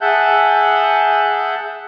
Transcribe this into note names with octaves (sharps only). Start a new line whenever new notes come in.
G#4 E5 F#5 A5 F#6 G6